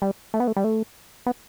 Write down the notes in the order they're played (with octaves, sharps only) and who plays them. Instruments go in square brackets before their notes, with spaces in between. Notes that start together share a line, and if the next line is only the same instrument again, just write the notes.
[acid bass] G3
A3
B3
A3
G3
A3
B3